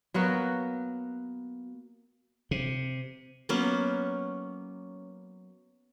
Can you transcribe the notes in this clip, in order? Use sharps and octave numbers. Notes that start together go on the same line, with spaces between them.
F#3 A#3 B3 F#4
C3
F#3 A#3 B3 C#4